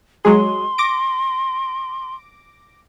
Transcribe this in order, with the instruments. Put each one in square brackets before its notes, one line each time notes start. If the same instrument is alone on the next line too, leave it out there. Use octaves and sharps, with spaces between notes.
[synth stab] F#3 G#3 G#4 [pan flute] C6
[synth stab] D6 A#6 D7